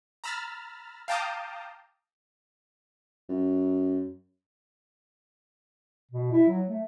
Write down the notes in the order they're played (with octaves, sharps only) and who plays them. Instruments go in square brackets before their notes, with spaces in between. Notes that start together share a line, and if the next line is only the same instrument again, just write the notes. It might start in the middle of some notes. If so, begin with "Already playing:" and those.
[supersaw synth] A#5 B5 E6 F6 A6
F5 G5 A5 A#5 D6 D#6
[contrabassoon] F#2
[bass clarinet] B2
E4
F#3
A3